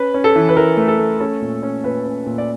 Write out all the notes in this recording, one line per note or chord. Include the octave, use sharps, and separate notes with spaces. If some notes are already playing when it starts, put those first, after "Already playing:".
Already playing: C#4 B4
C#4
A4
E3
B4
E3 A#4
A3
A4
A3
C#4 A4
A#2
C#4
A#2 B4
C#4
A#2
D5